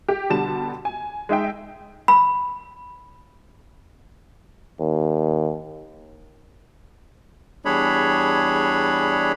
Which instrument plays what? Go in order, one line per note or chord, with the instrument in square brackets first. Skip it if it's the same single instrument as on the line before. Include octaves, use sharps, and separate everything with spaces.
[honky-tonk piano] G4
B2 D3 G3 A5 E7
G#5
G#3 D#4 E5 G5
[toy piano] B5
[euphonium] D#2
[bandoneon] E2 G3 D4 G#4 C#5 B5